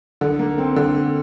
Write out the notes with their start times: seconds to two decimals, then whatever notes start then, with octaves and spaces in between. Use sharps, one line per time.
0.21 D3
0.39 A#3
0.58 C4
0.76 D3